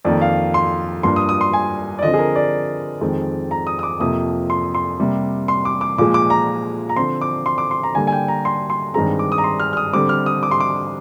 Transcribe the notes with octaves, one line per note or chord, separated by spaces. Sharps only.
F2 D#3 A#3 D5
F5
C6
G2 F3 A#3 C6
D#6
D#6
C6
G#5
D5
D3 F3 C4 D#5
G#4
A#4
D5
F2 D#3 G#3 C4
A#5
D#6
D#6
D6
F2 C3 F3 A#3 D#6
C6
C6
C3 G3 A#3
C6
D6
D6
A#2 F3 G#3 D6
D6
A#5
A#5
D3 F3 C4 C6
D6
C6
D6
C6
A#5
D3 G3 A#3 G#5
G#5
G5
A#5
C6
C6
G2 D#3 G#3 C4 A#5
D6
D#6
A#5
C6
F6
F6
D#6
D3 G3 C4 D6
F6
D#6
D6
C6
D6